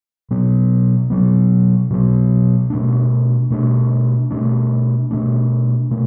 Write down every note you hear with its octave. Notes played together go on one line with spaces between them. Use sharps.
B2 F#3 B3
B2 F#3 B3
B2 F#3 B3
B2 A3 D4
B2 A3 D4
B2 A3 D4
B2 A3 D4
B2 A3